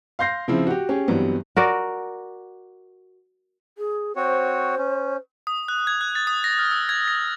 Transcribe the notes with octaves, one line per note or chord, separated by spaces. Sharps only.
F5 C6 G6 A#6 C7
C#3 F3 C4 E4
F#4 G4
C#4 G4 G#4
G2 E3 F#3 G3 B3 C4
F#4 A#4 D5
G#4
C4 F#4 C5 C#5
C#4
D#6
F#6
G#6
F#6
A6
D#6
A#6
F6
E6
G#6
A#6